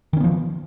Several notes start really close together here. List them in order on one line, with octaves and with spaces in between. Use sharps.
D#3 C#4 B3 F3